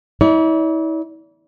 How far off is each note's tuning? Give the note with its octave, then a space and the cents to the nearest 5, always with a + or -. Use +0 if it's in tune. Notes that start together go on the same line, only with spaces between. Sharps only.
E4 -40 D5 -40